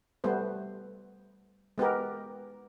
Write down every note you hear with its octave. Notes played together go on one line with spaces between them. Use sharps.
G3 A3 B3 C5
G#3 B3 G4 A#4